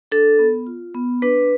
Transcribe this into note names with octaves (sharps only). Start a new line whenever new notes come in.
D4 A4
B3
F4
B3
D4 B4